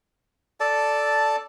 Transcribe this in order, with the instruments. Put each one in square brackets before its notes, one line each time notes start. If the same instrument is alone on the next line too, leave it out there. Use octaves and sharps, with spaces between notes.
[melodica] A4 D5 A5